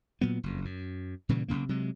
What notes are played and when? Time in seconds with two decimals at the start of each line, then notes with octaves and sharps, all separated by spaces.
0.21 A#2 F#3 B3
0.43 F#1 F2
0.65 F#2
1.29 A#2 C#3 E3 G3
1.48 B1 F#2 C#3 A#3
1.69 C3 F#3 G#3